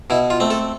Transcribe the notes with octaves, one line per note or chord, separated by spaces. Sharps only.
B2 E4
F4
A3 C4
A4